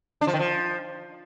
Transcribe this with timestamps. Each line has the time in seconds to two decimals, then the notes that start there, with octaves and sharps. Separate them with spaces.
0.21 D4
0.27 F3
0.33 D#3
0.39 F3